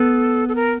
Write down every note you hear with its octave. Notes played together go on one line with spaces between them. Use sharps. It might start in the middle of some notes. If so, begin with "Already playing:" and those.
Already playing: B3 A4
A4
A#4